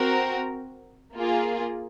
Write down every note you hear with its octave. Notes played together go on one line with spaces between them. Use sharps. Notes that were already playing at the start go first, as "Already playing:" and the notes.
Already playing: C4 F#4 A#4
A#3 F4 G#4